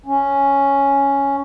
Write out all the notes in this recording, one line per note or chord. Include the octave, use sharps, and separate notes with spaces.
C#4